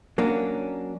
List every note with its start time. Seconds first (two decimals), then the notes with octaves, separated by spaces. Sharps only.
0.18 F#3 A#3 C#4 D4